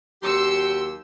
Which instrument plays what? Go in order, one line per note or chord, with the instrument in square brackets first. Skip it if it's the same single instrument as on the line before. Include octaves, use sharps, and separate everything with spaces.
[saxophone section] D#2 F#3 G4 [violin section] C6 E6 C#7